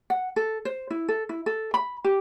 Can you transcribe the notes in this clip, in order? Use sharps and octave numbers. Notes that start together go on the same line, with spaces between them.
F#5
A4
C5
E4
A4
E4
A4
B5
G4